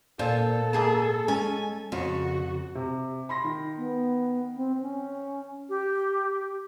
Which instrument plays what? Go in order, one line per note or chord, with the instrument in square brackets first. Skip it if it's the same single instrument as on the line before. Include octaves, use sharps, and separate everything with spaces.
[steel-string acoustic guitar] A#2 [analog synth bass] A#3 [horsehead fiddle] A4 [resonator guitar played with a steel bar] C5
[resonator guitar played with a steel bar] G#2 G#4 A5 [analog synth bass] A#3
[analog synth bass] G#3 [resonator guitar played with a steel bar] C#4 [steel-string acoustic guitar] G#5
[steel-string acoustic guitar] F2 [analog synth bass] C#3 [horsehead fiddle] F#4
[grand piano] C3
B5 C6 A#6
D#3
[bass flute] B3
C4
C#4
[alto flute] G4